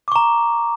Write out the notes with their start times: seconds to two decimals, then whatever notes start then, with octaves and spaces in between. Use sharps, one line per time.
0.08 D6
0.12 C#6
0.16 A#5